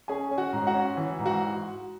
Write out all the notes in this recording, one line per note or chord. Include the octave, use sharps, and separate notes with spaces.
C#4 G#4 G#5
C#4
F#4 F#5
G#2
F#4 F#5
C#4
E3
G#2
F#4 F#5